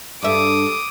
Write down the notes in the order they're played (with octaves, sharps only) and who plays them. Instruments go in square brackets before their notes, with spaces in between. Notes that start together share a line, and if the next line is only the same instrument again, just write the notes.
[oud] G2 E5 [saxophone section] G3 A4 [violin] D6 D#6